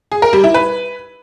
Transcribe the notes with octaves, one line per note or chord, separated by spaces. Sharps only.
G#4
A#4
G3
E4
B4